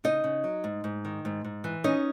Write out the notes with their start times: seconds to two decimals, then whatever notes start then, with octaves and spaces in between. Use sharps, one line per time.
0.04 C#3 D#4 D#5
0.24 C#3
0.44 F#3
0.64 G#2
0.84 G#2
1.05 D#3
1.25 G#2
1.44 G#2
1.64 E3
1.84 C#4 D#4 D#5